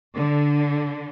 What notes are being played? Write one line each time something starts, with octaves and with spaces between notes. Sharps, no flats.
D3